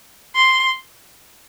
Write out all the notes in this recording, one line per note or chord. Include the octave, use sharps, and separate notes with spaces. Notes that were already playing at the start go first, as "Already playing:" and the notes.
C6